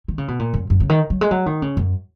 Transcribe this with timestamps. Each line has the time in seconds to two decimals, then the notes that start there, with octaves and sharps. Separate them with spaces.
0.08 D#3
0.18 C#3
0.28 B2
0.39 A#2
0.54 F#2
0.70 F#2
0.80 C#3
0.89 D#3
1.10 F#3
1.21 G#3
1.31 F#3
1.46 D#3
1.62 C#3
1.77 F#2